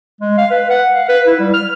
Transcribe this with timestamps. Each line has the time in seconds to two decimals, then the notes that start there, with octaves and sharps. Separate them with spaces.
0.21 G#3
0.38 F5
0.51 B4
0.70 F#5
0.95 F5
1.09 B4
1.27 E4
1.40 G3
1.54 F6